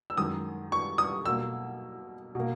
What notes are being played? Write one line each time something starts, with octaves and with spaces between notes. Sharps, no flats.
E6
F#2 D#3 G#3 D#6
C#6
D#6
B2 A#3 E6
B2 A#3